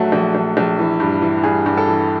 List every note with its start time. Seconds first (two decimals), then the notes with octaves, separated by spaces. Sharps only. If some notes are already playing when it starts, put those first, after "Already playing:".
Already playing: A#1 F#3 A3 F#4
0.12 A#1
0.35 A#1
0.57 A#1
0.79 E3
1.00 G2
1.22 E3
1.43 G2 G#4
1.66 G2
1.77 A4
1.88 E3